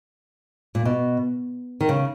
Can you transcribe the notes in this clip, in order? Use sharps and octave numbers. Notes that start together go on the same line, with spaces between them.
A#2
B2
D#3
C#3